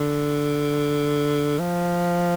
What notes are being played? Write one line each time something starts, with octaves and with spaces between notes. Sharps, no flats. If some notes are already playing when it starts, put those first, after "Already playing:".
Already playing: D3
F3